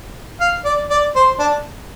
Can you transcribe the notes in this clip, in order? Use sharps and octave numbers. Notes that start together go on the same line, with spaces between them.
F5
D5
D5
C5
D4